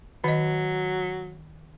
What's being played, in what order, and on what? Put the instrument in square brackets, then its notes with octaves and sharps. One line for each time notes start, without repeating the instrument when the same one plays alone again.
[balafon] D#3 D#5 [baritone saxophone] F#3